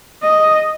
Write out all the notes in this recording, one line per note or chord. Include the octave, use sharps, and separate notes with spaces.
D#5